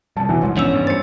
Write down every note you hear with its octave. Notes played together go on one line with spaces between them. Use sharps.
C3 F3 G3 A5
E2 B2 E3 F#3
A#1 G#2 C3 F3
E2 C#4 D4 E6
G2
C5 A6 C#7